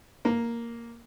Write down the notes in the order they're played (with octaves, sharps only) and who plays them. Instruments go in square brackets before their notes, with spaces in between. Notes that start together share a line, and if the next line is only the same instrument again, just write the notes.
[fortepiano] A#3